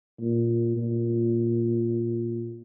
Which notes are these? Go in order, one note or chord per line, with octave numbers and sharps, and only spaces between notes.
A#2
A#2